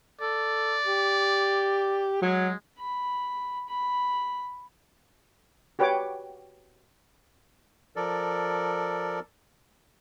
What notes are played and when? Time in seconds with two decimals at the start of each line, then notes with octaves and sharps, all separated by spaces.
0.21 A4 D5
0.86 G4
2.22 F#3 G#3
2.79 B5
3.69 B5
5.79 F#4 G4 B4 C#5 G5 D6
7.96 F3 A4 A#4 D5